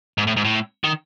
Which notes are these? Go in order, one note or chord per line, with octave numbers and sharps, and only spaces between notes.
G#2
A2
G#2
A2
D#3